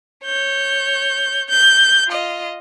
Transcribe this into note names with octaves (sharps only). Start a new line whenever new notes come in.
C#5 G6
G6
F4 D#5